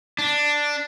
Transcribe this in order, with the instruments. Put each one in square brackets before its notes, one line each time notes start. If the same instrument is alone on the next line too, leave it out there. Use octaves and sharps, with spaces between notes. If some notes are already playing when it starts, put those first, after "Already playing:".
[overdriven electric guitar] D4